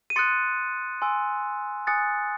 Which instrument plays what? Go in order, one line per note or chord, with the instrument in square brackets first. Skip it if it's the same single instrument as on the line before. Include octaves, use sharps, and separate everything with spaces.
[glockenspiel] D#7
C6 D#6 F#6 A6 C#7
G#5 C6 E6
G#5 D#6 F#6 A6 C#7